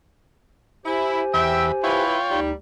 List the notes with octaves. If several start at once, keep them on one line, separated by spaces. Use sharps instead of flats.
E4 G4 C5 G#5
E2 E5 G5 B5
E4 F4 B4 C#5 G5
D2 G3 D#4